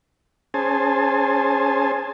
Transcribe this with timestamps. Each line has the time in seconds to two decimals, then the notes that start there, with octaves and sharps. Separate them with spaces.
0.54 C#4 G#4 C5 G#5 A5